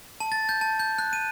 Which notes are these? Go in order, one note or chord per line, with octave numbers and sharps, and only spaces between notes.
A5
A6
G6
A5
G6
F#6
D#7